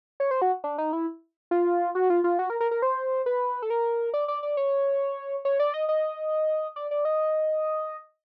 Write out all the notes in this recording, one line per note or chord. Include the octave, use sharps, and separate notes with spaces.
C#5
C5
F#4
D4
D#4
E4
F4
F#4
F4
F4
F#4
A#4
A#4
A#4
C5
B4
A4
A#4
D5
D5
D5
C#5
C#5
D5
D#5
D#5
D5
D5
D#5